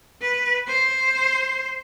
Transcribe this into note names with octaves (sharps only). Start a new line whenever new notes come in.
B4
C5